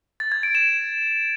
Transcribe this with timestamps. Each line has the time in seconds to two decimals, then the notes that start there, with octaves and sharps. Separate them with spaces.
0.20 A6
0.32 G#6
0.43 D7
0.55 E7